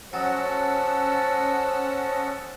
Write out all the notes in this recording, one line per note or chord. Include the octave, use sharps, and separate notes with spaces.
F#3 C#4 A4 C5 D#5 F#5 A5 E6